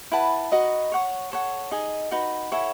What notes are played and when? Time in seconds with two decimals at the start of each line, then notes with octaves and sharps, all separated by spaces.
0.11 E4 B4 F#5 A5
0.52 D#4 F#4 B4 D#5
0.92 C#5 F#5 C#6
1.32 A4 C#5 F#5
1.71 D#4 G#4 D#5 G#5
2.11 D#4 F#4 B4
2.52 E4 A4 C#5 F#5